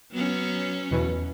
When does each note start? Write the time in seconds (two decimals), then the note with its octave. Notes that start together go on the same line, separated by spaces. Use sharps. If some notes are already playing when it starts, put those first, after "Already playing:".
0.12 F#3 B3 C#4
0.91 E2 B2 E3